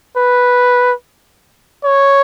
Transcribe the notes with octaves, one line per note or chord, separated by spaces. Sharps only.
B4
C#5